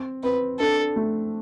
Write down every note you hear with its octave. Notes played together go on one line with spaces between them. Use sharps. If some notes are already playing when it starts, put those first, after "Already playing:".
Already playing: C4
C4 B4
D4 A4
A3